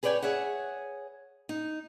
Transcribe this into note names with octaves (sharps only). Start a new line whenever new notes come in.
G#4 B4 C#5 D5 G5 G#5
G#4 C#5 E5 F#5
D#4